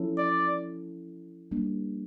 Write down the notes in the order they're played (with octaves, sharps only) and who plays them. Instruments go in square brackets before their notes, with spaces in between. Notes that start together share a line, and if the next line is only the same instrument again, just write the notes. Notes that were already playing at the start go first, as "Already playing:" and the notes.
Already playing: [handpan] F3 C#4 E4 A4
[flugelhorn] D5
[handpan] G3 A#3 D4